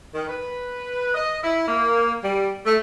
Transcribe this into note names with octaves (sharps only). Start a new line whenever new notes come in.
D#3
B4
D#5
E4
A#3
G3
A3